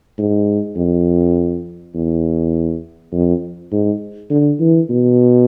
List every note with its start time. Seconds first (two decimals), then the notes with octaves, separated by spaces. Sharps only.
0.18 G#2
0.76 F2
1.95 E2
3.13 F2
3.72 G#2
4.30 D3
4.60 E3
4.90 B2